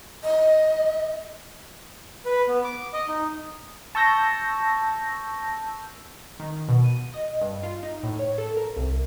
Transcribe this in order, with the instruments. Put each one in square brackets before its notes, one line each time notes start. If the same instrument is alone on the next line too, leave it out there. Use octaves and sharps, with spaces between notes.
[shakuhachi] D#5
[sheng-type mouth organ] B4
B3
D6
D#5
D#4
[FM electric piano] A5 C#6 E6 G6 A#6
[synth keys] D#3
B2
D#7
D#5
G2
F4
D#4
A2
C#5
A4
A#4
C2